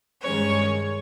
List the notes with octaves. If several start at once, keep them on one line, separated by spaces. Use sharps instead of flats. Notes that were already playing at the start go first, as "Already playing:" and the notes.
G2 D#3 G#3 C#4 C#5